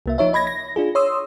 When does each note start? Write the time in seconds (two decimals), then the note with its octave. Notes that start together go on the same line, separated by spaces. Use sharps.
0.06 C2 A#3 E5
0.18 F3 D#4 C#5 E5
0.33 D#5 B5 G#6 A#6
0.47 A#6
0.76 D4 F4 G#4
0.95 C#5 C6 D#6 E6